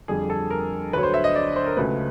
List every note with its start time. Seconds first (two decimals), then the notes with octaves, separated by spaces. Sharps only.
0.08 F2 D3 G3 G#4
0.30 A4
0.50 A#4
0.93 D2 D3 F#3 B4 C#5
1.03 C5
1.14 E5
1.24 D#5
1.35 D5
1.56 C5
1.66 A#4
1.76 C#2 C#3 F#3 A3 B4